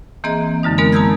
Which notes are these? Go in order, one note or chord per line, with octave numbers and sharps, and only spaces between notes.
E3 A#3 C4 G#4 D#5 A#5
F#2 D3 G#3 D#4
G#3 B3 C4 D#4 A#4
A5 A#5 D#6 E6 G6 G#6